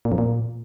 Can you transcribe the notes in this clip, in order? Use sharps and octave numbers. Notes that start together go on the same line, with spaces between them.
A#2
F2
A#2